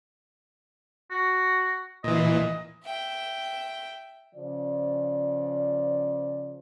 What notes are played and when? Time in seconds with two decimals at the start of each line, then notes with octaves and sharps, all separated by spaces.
1.11 F#4
2.04 A#2 E3 D#5
2.84 E5 G5
4.35 C#3 F3 D5